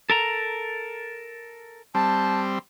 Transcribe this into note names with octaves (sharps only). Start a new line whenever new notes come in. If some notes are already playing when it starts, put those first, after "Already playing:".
A4 A#4 A#5
G3 C4 A5